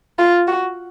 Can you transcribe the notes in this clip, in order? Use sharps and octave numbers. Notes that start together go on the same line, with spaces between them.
F4
F#4